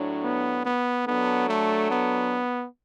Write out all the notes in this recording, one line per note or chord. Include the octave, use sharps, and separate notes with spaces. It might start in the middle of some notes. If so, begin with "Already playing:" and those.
Already playing: A2 F#3 D4
B3
B3
F#3 B3 D4 A4
A3
B3